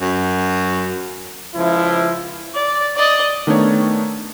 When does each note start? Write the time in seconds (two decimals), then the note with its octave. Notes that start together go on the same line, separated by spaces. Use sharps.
0.01 F#2
1.55 C#2 F3 E4
2.55 D5
2.96 D5 D#5
3.47 D#3 A3 B3 D4 D#4 C#5